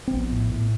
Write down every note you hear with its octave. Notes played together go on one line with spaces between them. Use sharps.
C4
A#1 B3
A2
A2